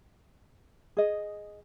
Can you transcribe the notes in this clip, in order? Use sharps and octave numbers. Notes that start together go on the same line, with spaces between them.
G#4 D#5